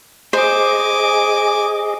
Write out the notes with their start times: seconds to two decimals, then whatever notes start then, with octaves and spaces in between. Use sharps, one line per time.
0.33 G#4 C5 D#5 G#5 D6